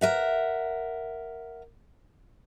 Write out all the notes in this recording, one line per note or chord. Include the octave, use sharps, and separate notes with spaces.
A#4 E5 F#5